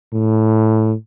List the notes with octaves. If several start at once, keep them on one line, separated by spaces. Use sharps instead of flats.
A2